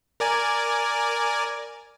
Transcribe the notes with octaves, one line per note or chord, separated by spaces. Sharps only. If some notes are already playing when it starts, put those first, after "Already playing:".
A#4 D5 G#5